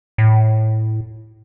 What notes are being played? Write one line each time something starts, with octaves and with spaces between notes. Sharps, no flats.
A2